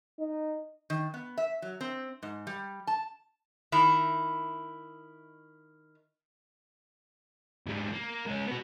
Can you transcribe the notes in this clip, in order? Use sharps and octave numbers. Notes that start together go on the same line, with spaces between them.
D#4
D#3
B3
E5
F#3
C4
G#2
G3
A5
D#3 E4
G#2 G3
A#3
G#3 C#4
B3 F#4